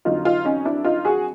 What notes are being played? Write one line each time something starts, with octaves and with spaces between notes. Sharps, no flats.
F2 D3 F#3 D#4 F4
D#4 F4
C#4 D#4
D4 E4
D#4 F4
F#4 G#4